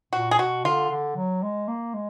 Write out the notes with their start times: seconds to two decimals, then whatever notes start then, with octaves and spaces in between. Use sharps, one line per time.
0.13 A#2 F#4
0.31 G#4
0.39 B2 F#4
0.65 D3 F4
0.90 D3
1.16 F#3
1.42 G#3
1.68 A#3
1.94 G#3